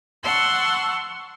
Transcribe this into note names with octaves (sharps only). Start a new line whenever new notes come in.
F#5 A5 C6 C#6 E6